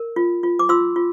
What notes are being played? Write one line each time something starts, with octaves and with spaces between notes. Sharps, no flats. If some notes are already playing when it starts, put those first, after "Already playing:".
Already playing: A#4
F4
F4
D6
F4 C6 E6
F4